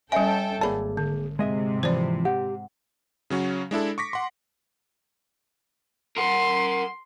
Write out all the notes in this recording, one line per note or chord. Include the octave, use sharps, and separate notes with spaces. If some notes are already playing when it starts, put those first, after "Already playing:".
G3 C#4 A4 C#5 D#5 E5 G5 G#5
G#1 A#3 G#4 A#4 C#5 D5 A5 B5
D3
G#2 C3 G#3 D#5 E5
E3 F3 C5 D5
G4 F#5
C#3 F#3 C#4 F#4
G#3 D4 E4 A4
C#6 D6 A#6 B6
F#5 C6
A#4 F#5 C6